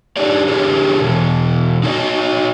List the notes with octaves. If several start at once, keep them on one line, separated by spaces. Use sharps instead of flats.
D4 D#4 G4 C#5 D5
D3 E4 G4 G#4 A#4 C#5
B2 E3
D#4 E4 F#4 A#4 C#5 D#5